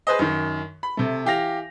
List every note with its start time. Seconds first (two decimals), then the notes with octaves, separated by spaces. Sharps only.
0.07 G#4 B4 C5 D#5
0.19 F#2 D#3
0.83 B5
0.97 C3 A3
1.25 E3 G4 F5 A#6 F7